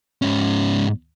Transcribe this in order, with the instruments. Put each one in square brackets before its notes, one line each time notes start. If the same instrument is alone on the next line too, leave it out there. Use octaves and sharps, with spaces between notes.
[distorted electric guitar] G#2 C#4